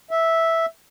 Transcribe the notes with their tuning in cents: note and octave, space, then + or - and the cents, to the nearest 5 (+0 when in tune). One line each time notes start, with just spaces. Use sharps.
E5 -5